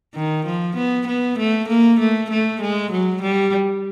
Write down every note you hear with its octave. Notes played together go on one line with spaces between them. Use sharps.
D#3
F3
B3
B3
A3
A#3
A3
A3
G#3
F#3
G3